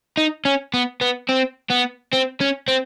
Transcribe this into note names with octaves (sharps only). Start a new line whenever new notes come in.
D#4
C#4
B3
B3
C4
B3
C4
C#4
C4